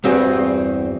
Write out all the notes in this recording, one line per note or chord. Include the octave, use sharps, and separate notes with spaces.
E2 G2 C4 F#4 G#4 B4